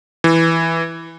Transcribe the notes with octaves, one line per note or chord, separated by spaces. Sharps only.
E3